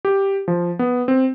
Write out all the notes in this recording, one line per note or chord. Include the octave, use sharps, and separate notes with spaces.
G4
F3
B3
C4